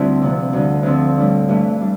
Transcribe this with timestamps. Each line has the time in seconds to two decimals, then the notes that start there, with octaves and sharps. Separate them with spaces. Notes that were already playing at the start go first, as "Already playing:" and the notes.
Already playing: D2 D3 G3 C4 E4
0.22 C3 F3 B3
0.53 D2 D3 G3
0.83 D2 D3 F3 C4
1.17 A2 G3 D4
1.49 G2 E3 A3
1.81 G3 D4